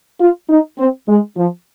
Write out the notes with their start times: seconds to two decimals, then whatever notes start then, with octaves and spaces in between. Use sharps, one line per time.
0.20 F4
0.49 D#4
0.78 C4
1.08 G#3
1.37 F3